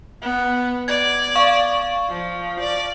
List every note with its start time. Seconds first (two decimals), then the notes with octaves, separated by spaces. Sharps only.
0.22 B3
0.88 D5 G#6
1.36 F5 C#6
2.10 F3
2.59 D5